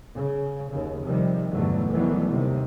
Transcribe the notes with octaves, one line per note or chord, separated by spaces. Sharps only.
C#3
D#2 C#3
C3 D#3 F3 G3
E2 G2 B2 D3 F#3 A3
D#3 E3 F#3 G3 A3 B3
D#2 C3 D#3